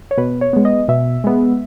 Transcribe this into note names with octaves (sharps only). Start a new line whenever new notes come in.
C#5
B2 B4
C#5
G#3 B3
D#5
B2 E5
G#3 B3